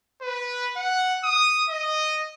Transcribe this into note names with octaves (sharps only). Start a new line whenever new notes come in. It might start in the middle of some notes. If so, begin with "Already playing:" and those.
B4
F#5
D#6
D#5